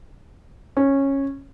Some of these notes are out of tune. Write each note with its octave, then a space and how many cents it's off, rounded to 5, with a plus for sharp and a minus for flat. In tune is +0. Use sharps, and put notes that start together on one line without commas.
C#4 -15